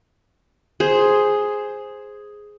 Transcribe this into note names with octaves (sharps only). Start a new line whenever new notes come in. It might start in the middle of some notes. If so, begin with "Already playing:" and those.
G#4 C5